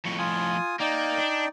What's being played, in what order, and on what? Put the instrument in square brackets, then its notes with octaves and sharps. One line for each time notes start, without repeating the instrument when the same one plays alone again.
[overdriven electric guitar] F2 A2 [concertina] C#6
[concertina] F4 G#5 D#6
[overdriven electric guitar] A#3 [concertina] D#4 D5 G5
[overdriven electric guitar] D4